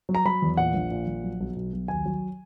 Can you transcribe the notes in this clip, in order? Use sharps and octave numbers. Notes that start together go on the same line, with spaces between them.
F#3
A#5
F#3 B5
E2
A#2 F#5
A#1
A#2
A#1
F#3
B1
B2
B1
D#2 G#5
F#3